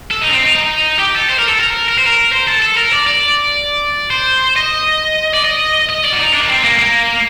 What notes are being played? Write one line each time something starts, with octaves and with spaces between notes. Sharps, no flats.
A4
D#4
D4
C4
D#4
D#4
G4
A4
C5
A#4
A4
A#4
A#4
C5
A#4
C5
A4
A4
A#4
D5
D5
C5
D#5
D5
D#5
D#5
D5
F#4
D#4
D4
A#3
C4
A#3
A#3